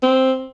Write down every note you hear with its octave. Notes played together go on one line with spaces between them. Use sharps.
C4